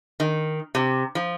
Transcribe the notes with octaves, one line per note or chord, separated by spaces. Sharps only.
D#3
C3
F3